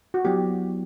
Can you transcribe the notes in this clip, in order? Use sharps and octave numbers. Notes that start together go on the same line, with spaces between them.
F#4
F#3 B3 E4 G4